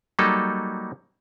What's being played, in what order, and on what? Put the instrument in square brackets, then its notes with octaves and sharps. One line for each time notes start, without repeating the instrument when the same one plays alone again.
[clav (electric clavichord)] F#3 G3 A#3 D#4 A4